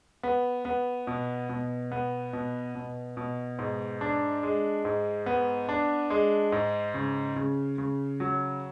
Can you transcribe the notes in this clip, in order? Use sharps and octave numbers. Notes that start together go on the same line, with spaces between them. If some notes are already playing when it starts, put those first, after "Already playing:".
B3
B3
B2
B2
B3
B2
B2
B2
G#2
D4
G#3
G#2
B3
D4
G#3
G#2
C#3
C#3
C#3
F#3